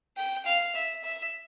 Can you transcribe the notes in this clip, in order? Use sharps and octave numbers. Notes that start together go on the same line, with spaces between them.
G5
F5
E5
E5